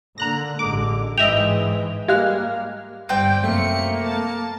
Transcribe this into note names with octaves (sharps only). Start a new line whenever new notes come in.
D3 A#3 A#5 F#6 A#6
A1 D3 G#3 D6
G#2 E3 G#3 D#5 E5 G5 F7
G3 G#3 A#3 G4 F5 F6 F#6
G1 G3 C4 D5 G5
F#2 C3 A3 A#3 C#7
A5